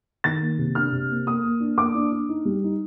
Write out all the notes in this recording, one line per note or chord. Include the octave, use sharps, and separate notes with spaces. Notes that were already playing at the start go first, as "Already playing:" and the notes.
D#3 A6
A#3
C3
D4 F6
C3
A#3
A#3 D#6
A#3
D4
A#3 D6
D4
D4
D#4
G3
D#4